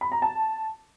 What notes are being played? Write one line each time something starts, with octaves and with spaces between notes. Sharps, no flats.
B5
A#5
A5